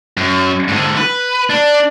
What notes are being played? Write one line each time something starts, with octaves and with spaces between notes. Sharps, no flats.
F#2
G#2 D3
B4
D4